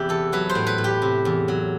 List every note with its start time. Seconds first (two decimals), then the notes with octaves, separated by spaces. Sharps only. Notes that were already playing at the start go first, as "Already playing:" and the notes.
Already playing: E2 C3 E4 G4 B4
0.09 E3 A4
0.33 F#3 B4
0.49 C5
0.55 A2
0.67 B4
0.78 A2
0.84 G4
1.02 C3
1.25 E2
1.48 F#3